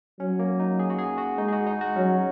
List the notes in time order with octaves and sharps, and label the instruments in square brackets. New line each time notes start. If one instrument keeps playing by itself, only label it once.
[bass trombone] F#3 [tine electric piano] C#4
[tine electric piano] A#3
D#4
G#4
F#4
G#4
F#4
[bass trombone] G#3 [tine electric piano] D#4
[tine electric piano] G#4
F#4
D#4
F#4
[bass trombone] F#3 [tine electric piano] C#4